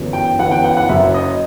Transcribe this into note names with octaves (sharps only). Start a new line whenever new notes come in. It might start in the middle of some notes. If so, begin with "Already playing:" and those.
Already playing: G1 F#2 E3
G5
G1 F#2 E3 F#5
G5
F#5
F#5
F#1 F#2 F#3 E5
D#5